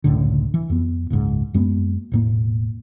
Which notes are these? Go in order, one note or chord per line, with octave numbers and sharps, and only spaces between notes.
F#1 C#2 A2 D3
E3
F2 B3
F#1 C#2 G#2
F#2 G#3 A#3 B3
E1 A2 A#3